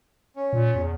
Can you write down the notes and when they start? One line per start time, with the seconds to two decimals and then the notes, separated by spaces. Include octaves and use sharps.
0.36 C#4
0.53 A#2
0.75 E2